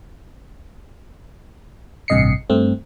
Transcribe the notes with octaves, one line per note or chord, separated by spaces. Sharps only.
A1 G2 C3 D#5 C7 C#7
G2 A3 C4